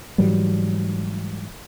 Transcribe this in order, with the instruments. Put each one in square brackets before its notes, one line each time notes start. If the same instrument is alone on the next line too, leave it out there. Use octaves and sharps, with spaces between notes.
[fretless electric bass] G#2 E3 F#3 G3